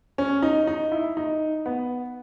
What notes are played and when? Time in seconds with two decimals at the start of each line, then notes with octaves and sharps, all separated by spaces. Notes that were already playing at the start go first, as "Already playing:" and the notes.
0.18 C#4
0.42 D#4
0.67 D#4
0.92 E4
1.17 D#4
1.66 B3